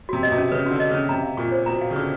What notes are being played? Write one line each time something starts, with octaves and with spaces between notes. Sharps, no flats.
C3 F#4
B2 D#5
C3
C#4
C#3 B4
D3 F#4
D#5
C#3
C#4
C3 A#5
F5
A#2 C#6
C5
B2 A#5
F5
C#3
D3 C#6